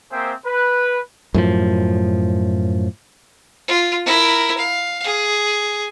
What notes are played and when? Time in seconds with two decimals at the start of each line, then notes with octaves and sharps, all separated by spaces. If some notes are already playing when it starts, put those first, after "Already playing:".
0.12 A#3 C4 G#4 C5 E5 G5
0.46 B4
1.34 F#2 A2 F3
3.68 F4
4.06 E4 A#4
4.58 F5
5.04 G#4